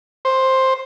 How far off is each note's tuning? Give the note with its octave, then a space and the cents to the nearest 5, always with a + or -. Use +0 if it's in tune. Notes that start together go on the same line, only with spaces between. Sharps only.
C5 +10